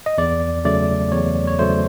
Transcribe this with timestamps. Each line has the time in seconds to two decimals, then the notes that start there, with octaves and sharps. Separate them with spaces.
0.06 D#5
0.18 E2 D5
0.65 C#3 F#3 A3 D5
1.12 E2 C#5
1.47 C#5
1.59 C#3 F#3 A3 C5